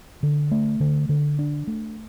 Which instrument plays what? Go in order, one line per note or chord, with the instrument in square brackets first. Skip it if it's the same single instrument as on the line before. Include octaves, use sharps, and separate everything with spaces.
[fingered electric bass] D3
A3
D3
D3
D4
A3